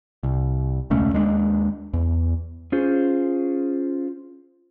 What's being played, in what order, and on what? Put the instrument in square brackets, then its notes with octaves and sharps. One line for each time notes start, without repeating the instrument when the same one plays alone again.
[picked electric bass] C2
E1 C#2 A3 C#4
D#2 G#3 B3 D4
E2
[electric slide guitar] C#4 F4 G#4 C5